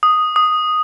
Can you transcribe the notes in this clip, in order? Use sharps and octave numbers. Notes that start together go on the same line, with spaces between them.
D#6
D#6